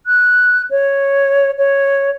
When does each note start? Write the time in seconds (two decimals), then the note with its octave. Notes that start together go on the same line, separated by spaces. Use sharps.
0.06 F#6
0.70 C#5
1.57 C#5